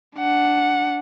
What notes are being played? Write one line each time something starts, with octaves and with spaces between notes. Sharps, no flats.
D4 F#5